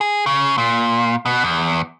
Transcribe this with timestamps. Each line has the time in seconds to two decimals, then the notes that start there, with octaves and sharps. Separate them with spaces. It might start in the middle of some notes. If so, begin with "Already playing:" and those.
0.01 G#4
0.26 C#3
0.58 A#2
1.26 B2
1.44 E2